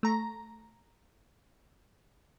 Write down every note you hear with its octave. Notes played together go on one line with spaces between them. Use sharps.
A3 A#5